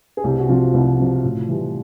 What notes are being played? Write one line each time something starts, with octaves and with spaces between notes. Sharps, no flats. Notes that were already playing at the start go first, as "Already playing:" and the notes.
G#4
C2 G4
F#4
C3 F3 F4
C2 F#4
C3 F3 F#4
A2 F4
E3 G3